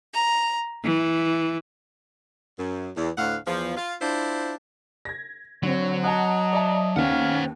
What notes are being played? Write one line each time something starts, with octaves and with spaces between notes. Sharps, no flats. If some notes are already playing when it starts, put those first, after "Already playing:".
A#5
E3
F#2
E2
D2 A2 F5 F#5
E2 F3
F4
D4 E4 F4 C5
G#6 A#6
D3 F#3 C4 C#5
D#5 F#5 A5 A#5
D5 E5 A5
D#2 B3 C#4 C5 F5 F#5